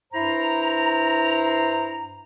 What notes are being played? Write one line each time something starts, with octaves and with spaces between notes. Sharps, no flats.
G2 E4 C5 A#5